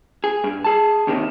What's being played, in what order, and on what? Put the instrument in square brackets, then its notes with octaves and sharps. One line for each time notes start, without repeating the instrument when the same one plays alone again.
[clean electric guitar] G#4
G2
G#4 A5
D#2 C3 D#3